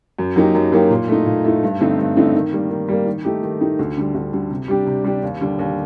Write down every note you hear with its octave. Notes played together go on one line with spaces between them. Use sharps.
F#2
F#3 A#3 D#4 G4
F#2
F#3 A#3 D#4 G4
A#2
A3 D#4
A#2
A3 D#4
G2
D3 A3 C4 D#4
G2
D3 A3 C4 D#4
D#3
G3 A#3
D#3
G3 A#3
D#3
A3 D#4 G4
D#3
A3 D#4 G4
D2
D3 G3
D2
D3 G3
C3
G3 D4 G4
C3
G3 D4 G4
D#2
D3 G3
D#2